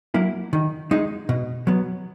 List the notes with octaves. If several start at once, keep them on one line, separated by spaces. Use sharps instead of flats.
F#3 A#3 E4
D#3
G#3 D#4
B2
F#3 B3